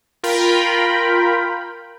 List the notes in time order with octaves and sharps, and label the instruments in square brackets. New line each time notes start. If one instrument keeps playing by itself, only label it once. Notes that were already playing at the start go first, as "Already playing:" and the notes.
[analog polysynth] F4 A#4 G5 B5